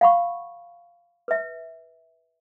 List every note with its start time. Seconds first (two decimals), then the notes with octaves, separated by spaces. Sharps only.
0.01 F5 F#5 B5 C#6
1.28 B4 E5